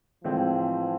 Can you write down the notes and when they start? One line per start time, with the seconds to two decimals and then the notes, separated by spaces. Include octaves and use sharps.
0.24 A2 E3 F3 G#3 C4